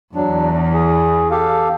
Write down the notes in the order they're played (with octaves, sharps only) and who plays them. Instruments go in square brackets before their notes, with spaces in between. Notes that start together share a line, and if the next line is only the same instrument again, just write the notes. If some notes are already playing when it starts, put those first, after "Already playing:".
[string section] E2 [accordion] F#3 D4
[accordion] G#4
G4 A4 F5